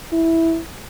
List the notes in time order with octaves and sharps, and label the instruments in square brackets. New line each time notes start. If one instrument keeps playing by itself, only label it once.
[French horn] E4